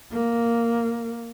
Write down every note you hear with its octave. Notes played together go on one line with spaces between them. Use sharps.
A#3